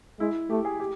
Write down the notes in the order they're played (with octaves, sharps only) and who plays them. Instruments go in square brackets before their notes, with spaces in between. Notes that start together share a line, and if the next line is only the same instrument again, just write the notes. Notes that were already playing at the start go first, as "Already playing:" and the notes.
[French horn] G#3 [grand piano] E4
[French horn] A3 [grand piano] G4
[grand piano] G#4
G4